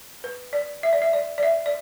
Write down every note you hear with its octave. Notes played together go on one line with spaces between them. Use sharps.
B4
D5
E5
D5
E5
D5
D5
E5
D5